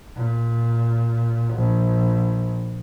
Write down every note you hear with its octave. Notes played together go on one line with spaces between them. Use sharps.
A#2
A#1